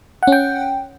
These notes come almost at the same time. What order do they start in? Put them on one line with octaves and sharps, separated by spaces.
F#5 C#4 G5